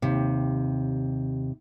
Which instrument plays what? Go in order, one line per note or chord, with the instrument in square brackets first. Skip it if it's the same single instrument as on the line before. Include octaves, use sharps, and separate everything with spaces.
[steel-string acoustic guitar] D#2 C3